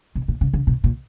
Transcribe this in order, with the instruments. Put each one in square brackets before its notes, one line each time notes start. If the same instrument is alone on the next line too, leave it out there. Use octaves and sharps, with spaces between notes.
[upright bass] B2
A#2
C#3
C#3
B2
A#2